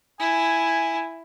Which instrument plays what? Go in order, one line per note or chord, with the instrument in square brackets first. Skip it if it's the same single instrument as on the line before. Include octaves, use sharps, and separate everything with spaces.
[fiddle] E4 [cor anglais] G#5